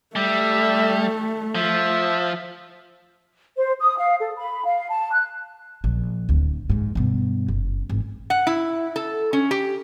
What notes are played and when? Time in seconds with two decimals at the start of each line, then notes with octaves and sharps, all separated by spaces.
0.16 G3 A3 E5
1.55 F3 E5
3.56 C5
3.79 D#6
3.97 F5
4.20 A4
4.36 B5
4.65 F5
4.89 A5
5.11 F#6
5.84 A#1
6.29 D1 D2
6.70 A#1 G#2
6.95 G2 B2
7.48 F#1
7.89 G#1 E3
8.30 F#5
8.47 E4
8.96 A4
9.33 C#4
9.51 G4